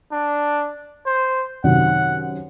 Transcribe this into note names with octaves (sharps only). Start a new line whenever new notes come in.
D4
C5
F#2 C3 D#3 F#5